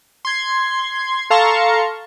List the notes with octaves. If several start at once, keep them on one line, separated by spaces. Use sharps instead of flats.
C6 G#6
A4 F5 A5 A#5 C6 C#6